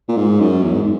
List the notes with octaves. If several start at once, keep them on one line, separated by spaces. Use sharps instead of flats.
A#2
G#2
F#2
E2
G#2